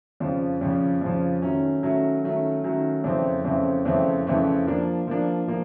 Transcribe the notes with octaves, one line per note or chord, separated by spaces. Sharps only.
F2 C#3 F3
F2 C#3 F3
F2 C#3 F3
D#3 F#3 A3 C#4
D#3 F#3 A3 C#4
D#3 F#3 A3 C#4
D#3 F#3 A3 C#4
F2 C#3 E3 A3 C4
F2 C#3 E3 A3 C4
F2 C#3 E3 A3 C4
F2 C#3 E3 A3 C4
F3 A#3 D4
F3 A#3 D4
F3 A#3